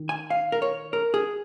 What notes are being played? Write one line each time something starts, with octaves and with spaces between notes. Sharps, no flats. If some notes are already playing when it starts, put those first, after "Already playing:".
Already playing: D#3
G#5
F5
A#4
C#5
A#4
G#4